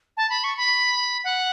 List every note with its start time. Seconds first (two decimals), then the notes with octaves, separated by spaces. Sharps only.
0.17 A5
0.30 B5
0.44 C#6
0.57 B5
1.24 F#5